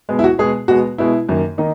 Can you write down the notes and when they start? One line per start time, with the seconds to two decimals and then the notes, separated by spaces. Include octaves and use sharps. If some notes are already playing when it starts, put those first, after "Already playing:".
0.09 B2 G#3 B3
0.19 E4
0.24 F#4
0.38 B2 G#3 B3 G#4
0.68 B2 G#3 B3 F#4
0.98 B2 G#3 B3 E4
1.29 F#2 D#3 A#3
1.58 D#3 A#3 D#4